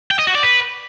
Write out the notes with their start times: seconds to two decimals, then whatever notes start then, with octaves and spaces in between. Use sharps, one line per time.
0.11 G5
0.19 D#5
0.27 F#4
0.35 D5
0.43 B4